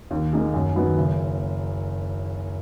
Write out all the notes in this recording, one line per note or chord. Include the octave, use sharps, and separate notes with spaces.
D#2
D#3 A#3 D#4 G#4
F#2
D#3 F#3 B3
F#1